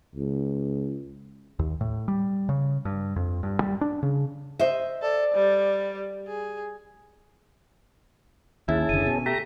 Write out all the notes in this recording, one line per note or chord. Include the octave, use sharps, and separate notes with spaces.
C#2
D#2
A2
G3
C#3
G2
F2
G2
G3
D4
C#3
C5 D#5 E5
A4 D5
G3
G#4
D#2 C#4 E4 G#4 A5
F#1 D3 D#7
B2
A3 G4 A#5 A#6 B6